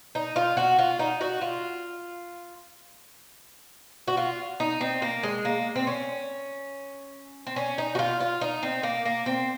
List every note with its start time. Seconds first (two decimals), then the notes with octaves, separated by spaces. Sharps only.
0.15 D#4
0.36 F4
0.57 F#4
0.79 F4
0.99 D#4
1.21 F#4
1.41 F4
4.08 F#4
4.17 F4
4.60 D#4
4.81 C4
5.02 A#3
5.23 G#3
5.45 A#3
5.75 C4
5.87 C#4
7.47 C4
7.56 C#4
7.78 D#4
7.95 F#4
7.99 F4
8.20 F4
8.41 D#4
8.63 C4
8.83 A#3
9.05 A#3
9.26 C4